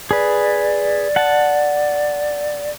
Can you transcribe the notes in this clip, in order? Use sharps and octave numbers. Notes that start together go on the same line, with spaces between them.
G#4 B4 D5
F#5 A5